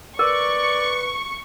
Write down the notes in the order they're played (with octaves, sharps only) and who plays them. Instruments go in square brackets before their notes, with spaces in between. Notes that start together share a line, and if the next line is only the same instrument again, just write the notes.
[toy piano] A#4 [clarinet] B4 [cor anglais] D5 [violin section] C#6